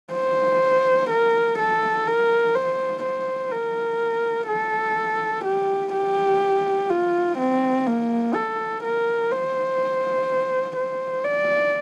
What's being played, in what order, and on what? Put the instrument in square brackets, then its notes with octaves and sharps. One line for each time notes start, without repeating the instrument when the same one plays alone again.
[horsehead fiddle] C5
A#4
A4
A#4
C5
C5
A#4
A4
G4
G4
F4
C4
A#3
A4
A#4
C5
C5
D5